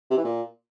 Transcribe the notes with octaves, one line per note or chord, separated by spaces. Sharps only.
C3
E3
A#2